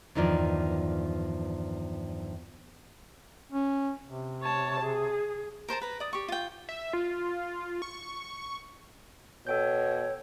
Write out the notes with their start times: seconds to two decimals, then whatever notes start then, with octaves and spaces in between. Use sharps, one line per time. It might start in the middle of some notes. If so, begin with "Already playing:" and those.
0.15 E2 G2 D#3 F3 D5
3.52 C#4
4.06 C3
4.42 C#5 A5
4.81 G#4
5.68 A#4 C5 A5 A#5
5.81 B4 A#5
6.00 D5 D#6
6.13 G4 C#6
6.28 F4 G5
6.69 E5
6.93 F4
7.82 C#6
9.47 B2 A4 C#5 G5 G6